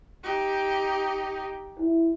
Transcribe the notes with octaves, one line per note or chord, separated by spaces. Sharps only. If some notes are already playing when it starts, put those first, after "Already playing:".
D#4 G4
E4